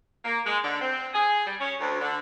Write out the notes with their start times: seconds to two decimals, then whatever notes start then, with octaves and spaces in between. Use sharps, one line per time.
0.25 A#3
0.46 G#3
0.64 D3
0.81 C4
1.14 G#4
1.47 G3
1.61 C#4
1.81 D2
2.01 D3